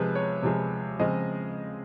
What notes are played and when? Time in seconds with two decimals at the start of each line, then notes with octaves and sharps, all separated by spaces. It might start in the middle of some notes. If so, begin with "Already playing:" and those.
Already playing: C3 F3 G#3 B4
0.15 C#5
0.42 C3 F3 G#3
0.99 C#3 F3 G#3 C4 D#5